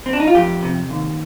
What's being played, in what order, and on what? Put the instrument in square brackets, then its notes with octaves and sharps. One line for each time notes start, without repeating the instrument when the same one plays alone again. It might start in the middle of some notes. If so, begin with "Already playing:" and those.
[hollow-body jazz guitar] C4
D4
D#4
F4
F2 G4
C3
D#2